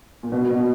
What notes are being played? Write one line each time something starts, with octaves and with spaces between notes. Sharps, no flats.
A#2
B2
B2